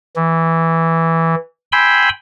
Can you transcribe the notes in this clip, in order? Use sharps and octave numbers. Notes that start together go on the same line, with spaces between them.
E3
G5 G#5 B5 C6 E6